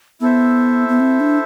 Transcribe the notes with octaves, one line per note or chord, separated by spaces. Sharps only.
B3 E4 A4 C5 E5
B3
C4
D4